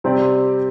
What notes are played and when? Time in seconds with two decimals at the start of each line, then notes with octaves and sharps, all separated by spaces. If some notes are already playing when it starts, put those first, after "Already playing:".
0.04 C3 G3 C4 G4 D5